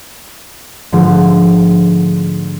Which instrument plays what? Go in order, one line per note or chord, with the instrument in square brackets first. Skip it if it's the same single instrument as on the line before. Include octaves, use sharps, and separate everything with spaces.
[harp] G#2 D3 F3 A3